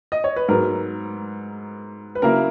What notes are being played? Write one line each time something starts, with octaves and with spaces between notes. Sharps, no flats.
D#5
C#5
B4
G#2 F#3 B3 A#4
B4
C#3 F#3 A#3 E4 A#4